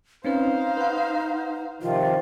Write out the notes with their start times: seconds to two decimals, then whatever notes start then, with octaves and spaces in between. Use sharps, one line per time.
0.24 C4 C#4 D#4 B4 C5 F5
0.77 B4 F#5
1.82 C3 D#3 F3 F4